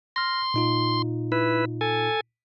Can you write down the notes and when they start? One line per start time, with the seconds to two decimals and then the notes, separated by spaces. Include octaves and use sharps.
0.16 C6 F6 A#6
0.54 A#2 D#4 F4
1.32 E4 B4
1.81 A4 G#5